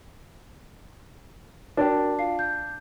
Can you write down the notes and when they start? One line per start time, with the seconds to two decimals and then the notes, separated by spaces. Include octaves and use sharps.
1.77 D4 F#4 A#4 G5
2.19 F4 F5 C7
2.39 G6